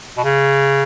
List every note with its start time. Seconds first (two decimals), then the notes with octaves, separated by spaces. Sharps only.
0.17 B2
0.23 C#3